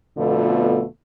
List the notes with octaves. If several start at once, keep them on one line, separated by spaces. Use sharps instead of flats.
F2 B2 D3 A3 B3 F4